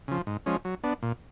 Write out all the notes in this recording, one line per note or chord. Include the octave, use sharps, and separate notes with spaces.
C#3 F3
G#2
F3 G#3 C#4
F#3
B3 D4
A#2